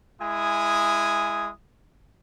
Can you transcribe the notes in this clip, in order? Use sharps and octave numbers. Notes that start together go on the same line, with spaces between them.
G#3 E4 G#5 D#6